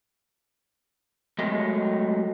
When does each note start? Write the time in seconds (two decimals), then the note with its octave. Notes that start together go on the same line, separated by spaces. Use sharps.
1.38 F#3 G#3 A3 D#5 E5